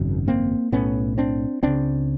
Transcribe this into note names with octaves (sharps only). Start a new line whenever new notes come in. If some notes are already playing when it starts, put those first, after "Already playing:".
Already playing: G#1 F#2 C#3
A#3 C4
B1 A2 B3 C#4
C4 D4
C#2 C#3 C4 D4